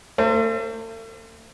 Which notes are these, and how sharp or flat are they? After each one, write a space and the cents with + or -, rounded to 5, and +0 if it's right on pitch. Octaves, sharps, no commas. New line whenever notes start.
A3 +45 C5 +0